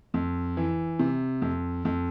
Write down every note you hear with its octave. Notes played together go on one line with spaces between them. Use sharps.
F2
E3
C3
F2
F2